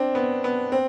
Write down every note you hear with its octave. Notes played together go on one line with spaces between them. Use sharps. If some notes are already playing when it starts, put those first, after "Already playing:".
Already playing: C4 D4
B3
B3
C4